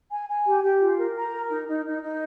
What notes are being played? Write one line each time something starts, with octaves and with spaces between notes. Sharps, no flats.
G#5
G#5
G4
G4
F4
A#4
A#5
A#4
D#4
D#4
D#4
D#4